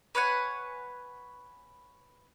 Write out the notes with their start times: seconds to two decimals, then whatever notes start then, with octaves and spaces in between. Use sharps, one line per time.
0.15 B4 C#5 F#5 G#5